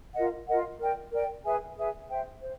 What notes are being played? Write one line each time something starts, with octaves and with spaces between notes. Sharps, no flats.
F4 A#4 D#5 F#5
F4 A#4 D#5 F#5
A#4 D5 G5
A#4 D5 G5
G#4 B4 E5 G#5
G#4 B4 E5 G#5
C5 E5 G5
C5